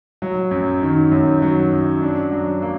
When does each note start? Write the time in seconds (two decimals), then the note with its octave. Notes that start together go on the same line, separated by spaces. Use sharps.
0.22 F#3
0.51 F#2
0.82 D#3
1.11 F#2
1.42 F#3
1.72 F#2
2.02 D4
2.32 F#3
2.62 A#3